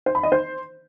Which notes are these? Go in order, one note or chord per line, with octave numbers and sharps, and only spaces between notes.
C5
B5
D#5
C5